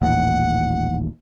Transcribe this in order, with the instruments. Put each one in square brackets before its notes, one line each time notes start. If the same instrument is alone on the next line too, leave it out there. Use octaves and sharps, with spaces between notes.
[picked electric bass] D#1 A1 D#2 [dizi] F#5